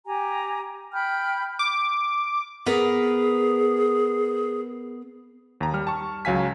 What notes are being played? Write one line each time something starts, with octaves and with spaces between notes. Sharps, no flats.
G4 G#5 A#5
G5 B5 F6 G6
D6
B3 G#4 A#4 B4
D#2 A#5
G3 F6
A5 C#6
C#2 F#3 F5 G#5 B6